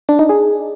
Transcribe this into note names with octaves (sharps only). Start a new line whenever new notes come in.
D4
D#4
G#4